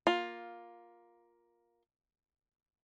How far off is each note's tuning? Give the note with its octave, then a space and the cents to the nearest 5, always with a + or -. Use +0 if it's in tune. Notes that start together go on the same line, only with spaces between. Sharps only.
A#3 +10 F4 +10